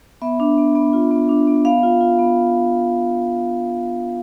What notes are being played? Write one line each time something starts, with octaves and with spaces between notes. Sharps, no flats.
B3 E5
D4
B3
B3
F4
B3
D4
B3
B3 F5
F4
F4
B3